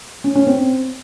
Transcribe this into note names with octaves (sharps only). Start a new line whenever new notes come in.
C#4
C#4
C4